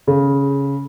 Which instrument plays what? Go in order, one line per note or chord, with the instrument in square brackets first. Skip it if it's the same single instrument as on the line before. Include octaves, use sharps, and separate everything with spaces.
[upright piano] C#3